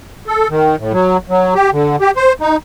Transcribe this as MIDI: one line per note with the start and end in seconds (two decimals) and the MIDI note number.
0.27 0.48 69
0.50 0.76 51
0.79 0.93 45
0.93 1.17 54
1.29 1.54 54
1.55 1.70 67
1.73 1.96 50
2.01 2.11 67
2.16 2.33 72
2.41 2.57 63